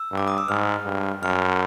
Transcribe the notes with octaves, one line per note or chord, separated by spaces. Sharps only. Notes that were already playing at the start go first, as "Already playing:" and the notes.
Already playing: E6
G2
D6
D#6
E6
G#2 F6
G2
F#2 F6